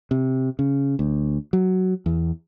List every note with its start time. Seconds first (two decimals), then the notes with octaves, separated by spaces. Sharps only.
0.11 C3
0.59 C#3
0.99 D2
1.53 F#3
2.06 E2